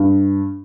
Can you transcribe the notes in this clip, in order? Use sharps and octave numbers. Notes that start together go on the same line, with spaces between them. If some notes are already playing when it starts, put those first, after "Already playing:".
Already playing: G2